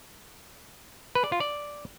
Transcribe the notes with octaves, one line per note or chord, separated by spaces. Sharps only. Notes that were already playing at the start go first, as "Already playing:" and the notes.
B4
D5
F4
D5